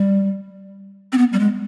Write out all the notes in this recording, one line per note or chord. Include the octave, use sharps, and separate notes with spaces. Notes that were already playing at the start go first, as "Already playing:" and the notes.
Already playing: G3
C4
B3
G3
G#3